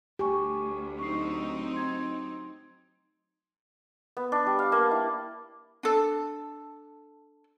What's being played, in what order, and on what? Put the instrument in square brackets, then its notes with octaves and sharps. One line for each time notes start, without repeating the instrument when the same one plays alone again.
[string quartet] D2 [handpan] G4 [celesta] G#5 C#6
[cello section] F#3 C4 D#4 [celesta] C#6 C7
[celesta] C6 G#6
[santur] B3
D4
G3
F5
A#3
E4
[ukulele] D4 A4